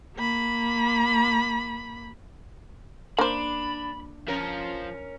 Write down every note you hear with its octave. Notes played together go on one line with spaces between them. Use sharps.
A#3 B5
A#3 D4 C5 B5
F3 C#4 A#4